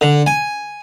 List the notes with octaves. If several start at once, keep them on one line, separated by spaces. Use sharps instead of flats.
D3
G#5